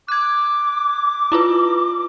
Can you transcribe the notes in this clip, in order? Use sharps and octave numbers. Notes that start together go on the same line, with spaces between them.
D6 F#6 G#6
E4 F4 B4